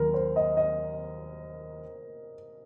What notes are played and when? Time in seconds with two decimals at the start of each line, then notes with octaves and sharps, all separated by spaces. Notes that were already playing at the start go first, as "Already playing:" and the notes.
Already playing: D#2 F#3 A#4
0.14 C5
0.36 D#5
0.57 D#5